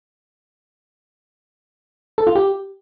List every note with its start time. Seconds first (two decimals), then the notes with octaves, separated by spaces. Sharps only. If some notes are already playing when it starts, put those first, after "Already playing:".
2.18 A4
2.27 F4
2.35 G4